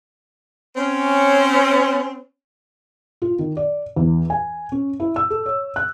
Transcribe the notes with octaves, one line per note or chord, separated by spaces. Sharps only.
C4 C#4
F4
D#3
D5
E2
G#5
C#4
E4
E6
A4
C#5
F#6